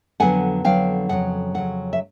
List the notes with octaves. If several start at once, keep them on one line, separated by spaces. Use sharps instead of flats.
F2 D3 F#3 B3 F#5 G#5
F2 D3 F#3 B3 F5 G5
F2 C#3 F#3 F#5
F2 C#3 F#3 F#5
E5